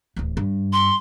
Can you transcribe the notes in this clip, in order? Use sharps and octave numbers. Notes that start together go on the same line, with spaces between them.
D1 E2
G2
C6